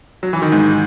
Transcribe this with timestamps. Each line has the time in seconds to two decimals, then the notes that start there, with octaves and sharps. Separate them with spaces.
0.23 F#3
0.33 E3
0.42 D#3
0.52 G#2